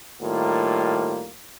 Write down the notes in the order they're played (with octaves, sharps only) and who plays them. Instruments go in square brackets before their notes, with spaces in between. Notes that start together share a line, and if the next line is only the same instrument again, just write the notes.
[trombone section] A2 D#3 G3 A#3 F4